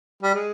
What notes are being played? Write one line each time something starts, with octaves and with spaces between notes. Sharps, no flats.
G3
G#3